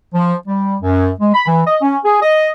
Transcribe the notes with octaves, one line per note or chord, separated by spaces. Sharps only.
F3
G3
F#2
G#3
B5
E3
D#5
C#4
G#4
D#5